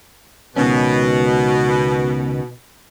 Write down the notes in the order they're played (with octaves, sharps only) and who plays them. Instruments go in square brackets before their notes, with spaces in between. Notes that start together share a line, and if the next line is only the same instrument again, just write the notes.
[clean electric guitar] C#2 D#3 C#4 [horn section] B2